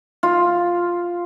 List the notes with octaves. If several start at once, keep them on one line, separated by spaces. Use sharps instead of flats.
F4